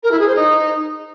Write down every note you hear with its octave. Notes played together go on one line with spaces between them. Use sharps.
A#4
E4
G#4
C5
D#4